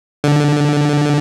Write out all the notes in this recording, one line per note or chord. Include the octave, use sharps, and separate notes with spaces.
D3